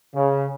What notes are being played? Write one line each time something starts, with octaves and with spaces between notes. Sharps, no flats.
C#3